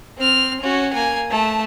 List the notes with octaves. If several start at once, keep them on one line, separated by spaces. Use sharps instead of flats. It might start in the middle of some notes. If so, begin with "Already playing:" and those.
C4 F6
C#4 F#4
A#3 G#5
A3 A5